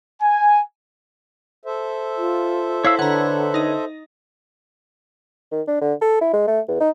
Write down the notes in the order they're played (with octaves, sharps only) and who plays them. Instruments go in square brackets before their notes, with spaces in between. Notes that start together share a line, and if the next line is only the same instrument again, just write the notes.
[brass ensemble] G#5
[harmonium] A4 C5 E5
[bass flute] F4
[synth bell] E4 [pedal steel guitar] C#5 F5 E6
[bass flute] D3 [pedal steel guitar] B4 C#5 [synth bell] F#5 A#5
[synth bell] D#4 D#5
[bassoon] D#3
D4
D3
A4
E4
G#3
A3
E2
D#4